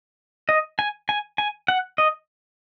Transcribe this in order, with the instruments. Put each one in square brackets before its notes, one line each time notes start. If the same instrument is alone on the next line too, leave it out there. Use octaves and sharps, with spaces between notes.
[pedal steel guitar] D#5
G#5
G#5
G#5
F#5
D#5